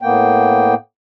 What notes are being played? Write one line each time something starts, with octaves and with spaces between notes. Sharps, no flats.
A2 A#3 B3 G5